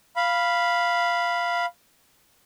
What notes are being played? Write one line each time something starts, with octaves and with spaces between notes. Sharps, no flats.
F5 B5